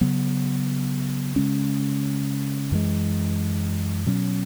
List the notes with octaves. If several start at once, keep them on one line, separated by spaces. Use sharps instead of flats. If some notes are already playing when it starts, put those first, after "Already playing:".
C#3 F#3 B3
C#3 G#3 C#4
F#2 E3 G#3
B2 F#3 C#4